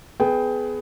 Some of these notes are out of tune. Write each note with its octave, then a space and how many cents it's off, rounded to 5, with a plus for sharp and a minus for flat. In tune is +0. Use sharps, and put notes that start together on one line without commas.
B3 +15 G#4 +20 G5 +0